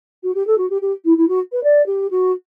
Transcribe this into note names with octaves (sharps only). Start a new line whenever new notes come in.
F#4
G4
A4
F#4
G4
G4
E4
E4
F#4
B4
D5
G4
F#4